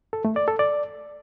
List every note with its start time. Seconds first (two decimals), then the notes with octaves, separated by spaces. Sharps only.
0.13 A4
0.25 A3
0.36 D5
0.48 A4
0.59 D5